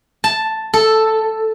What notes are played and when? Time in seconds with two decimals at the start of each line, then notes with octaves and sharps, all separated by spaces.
0.24 A5
0.74 A4